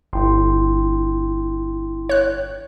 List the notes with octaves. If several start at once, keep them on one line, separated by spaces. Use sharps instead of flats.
G1 E4 G5 C6
C#5 F#6